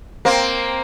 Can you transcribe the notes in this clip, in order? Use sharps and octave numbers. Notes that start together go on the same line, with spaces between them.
A#3 C4